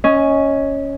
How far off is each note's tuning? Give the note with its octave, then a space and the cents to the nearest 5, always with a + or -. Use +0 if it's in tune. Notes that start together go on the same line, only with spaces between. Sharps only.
C#4 +0 D#5 +15